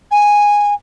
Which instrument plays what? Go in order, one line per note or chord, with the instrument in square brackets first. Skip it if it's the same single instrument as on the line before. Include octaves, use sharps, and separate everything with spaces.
[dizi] G#5